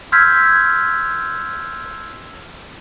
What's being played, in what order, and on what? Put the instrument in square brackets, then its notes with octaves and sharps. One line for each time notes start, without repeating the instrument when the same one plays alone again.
[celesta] C6 E6 F6 G6 G#6 B6